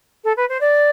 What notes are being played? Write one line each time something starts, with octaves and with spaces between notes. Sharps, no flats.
A4
B4
C5
D5